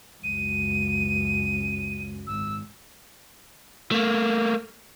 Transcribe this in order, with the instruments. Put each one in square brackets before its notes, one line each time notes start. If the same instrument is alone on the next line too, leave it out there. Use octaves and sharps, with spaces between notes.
[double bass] C#2 F#2 [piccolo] D#7
[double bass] G#1 [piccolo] E6
[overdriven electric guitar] A3 A#3